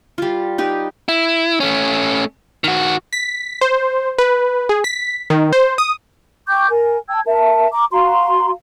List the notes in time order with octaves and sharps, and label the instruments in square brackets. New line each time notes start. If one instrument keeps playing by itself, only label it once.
[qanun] G3 F4
D#4 G4 B4
[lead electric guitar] E4
A3 C#4
D#3 F#4
[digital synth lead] B6
C5
B4
G#4
B6
D#3
C5
D#6
[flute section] G5 C#6 D6 G6
A#4 G#5
G5 A5 E6 G#6
A#4 E5 A5
A#5 D6
F#4 F5 A#5 C6